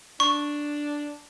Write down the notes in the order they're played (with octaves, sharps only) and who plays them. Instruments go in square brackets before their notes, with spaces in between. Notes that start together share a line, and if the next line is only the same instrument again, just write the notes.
[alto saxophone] D4 [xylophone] C#6